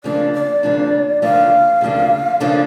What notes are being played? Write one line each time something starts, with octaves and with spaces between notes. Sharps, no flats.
D2 C#3 F3 A#3 D4 D5
D5
D2 C#3 F3 A#3 D4
D2 C#3 F3 A#3 D4 F5
D2 C#3 F3 A#3 D4
C#3 F3 A#3 D4 A4 F5